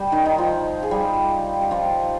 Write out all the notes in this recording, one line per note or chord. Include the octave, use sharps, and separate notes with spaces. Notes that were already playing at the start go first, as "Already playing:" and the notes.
Already playing: G3 G4
D#3 D#4
D#3 D#4
F3 F4
G#4
G3 G4
G4
F3 F4